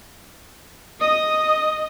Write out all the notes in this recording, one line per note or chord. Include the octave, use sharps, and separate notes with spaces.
D#5 D#6